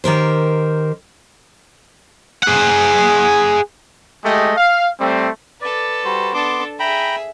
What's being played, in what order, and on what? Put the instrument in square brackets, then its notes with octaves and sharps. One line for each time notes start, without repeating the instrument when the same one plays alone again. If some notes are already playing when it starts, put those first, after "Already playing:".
[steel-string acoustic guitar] D#3 G4 A#4 C5
[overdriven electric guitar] G#4 F#5
[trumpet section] G#3 A3 G4 D#5
F5
G3 A3 C4
[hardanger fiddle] A4 B4 [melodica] D5
[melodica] G3 F#4 C5
[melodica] B3 C6 D6 [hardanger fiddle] D4 A4
[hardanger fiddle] G#4 E5 [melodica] G5 A#5 B5